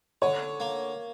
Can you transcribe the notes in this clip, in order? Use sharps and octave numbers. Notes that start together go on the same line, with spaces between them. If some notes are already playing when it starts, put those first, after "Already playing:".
D3 C#5
A#3